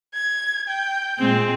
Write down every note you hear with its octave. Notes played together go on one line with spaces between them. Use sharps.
G#6
G5
A#2 G#3 C4